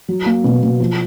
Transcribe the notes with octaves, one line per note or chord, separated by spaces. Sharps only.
F#3
A#3
B2
B2
F3